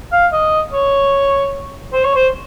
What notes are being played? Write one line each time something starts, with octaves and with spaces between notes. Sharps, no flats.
F5
D#5
C#5
C5
C#5
C5